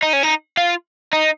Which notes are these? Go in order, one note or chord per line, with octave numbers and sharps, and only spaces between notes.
D#4
C#4
D#4
F4
D#4